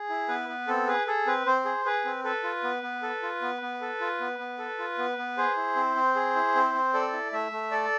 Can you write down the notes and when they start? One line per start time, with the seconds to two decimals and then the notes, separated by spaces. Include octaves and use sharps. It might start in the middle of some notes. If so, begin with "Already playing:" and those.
Already playing: G#4
0.09 E4
0.29 B3 B4
0.49 B3
0.67 C4 A4
0.88 G#4 B4
1.07 G#4 A4
1.27 C4 B4
1.46 C4 C5
1.65 G#4
1.85 G#4 B4
2.05 C4
2.24 A4 B4
2.44 F4
2.64 B3
2.83 B3
3.02 A4
3.23 F4
3.42 B3
3.62 B3
3.81 A4
4.01 F4
4.21 B3
4.39 B3
4.59 A4
4.79 F4
4.98 B3
5.18 B3
5.37 G#4 C5
5.56 E4
5.76 C4
5.96 C4
6.16 G#4
6.36 E4
6.55 C4
6.75 C4
6.94 A4 D5
7.13 E4
7.33 A3 E5
7.52 A3
7.71 A4 D5